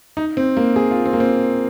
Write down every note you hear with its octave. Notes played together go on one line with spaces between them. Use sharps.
D#4
C4
A#3
G#4
F4
C4
A#3
C4